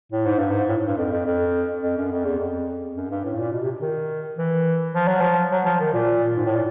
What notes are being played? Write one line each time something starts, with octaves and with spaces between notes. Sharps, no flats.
A2
G#2
G2
G#2
A2
G2
F2
F2
F2
F2
F#2
F2
E2
F2
F#2
G2
A2
A#2
B2
C3
D#3
E3
F3
F#3
F3
F#3
F3
D#3
A#2
G#2
A2
A#2